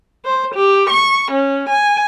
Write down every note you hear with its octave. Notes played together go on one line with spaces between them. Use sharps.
C5
G4
C#6
C#4
G#5